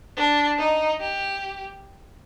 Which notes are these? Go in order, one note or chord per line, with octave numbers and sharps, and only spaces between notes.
D4
D#4
G4